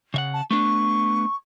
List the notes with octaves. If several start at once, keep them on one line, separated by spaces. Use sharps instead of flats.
C#3 E5 F#5
A5
A3 B3 D4 C#6